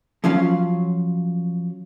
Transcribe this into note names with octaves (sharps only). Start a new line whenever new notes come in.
F3 F#3 C#4 F4 F5 F#5